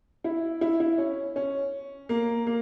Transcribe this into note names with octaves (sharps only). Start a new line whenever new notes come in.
E4
E4
E4
C#4
C#4
A#3
A#3